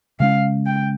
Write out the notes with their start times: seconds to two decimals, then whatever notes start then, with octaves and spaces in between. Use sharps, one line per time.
0.20 C#3 G#3 C#4 F5
0.66 G5